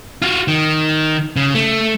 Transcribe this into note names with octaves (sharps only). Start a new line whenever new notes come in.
F4 F#4
D#3
C#3
A3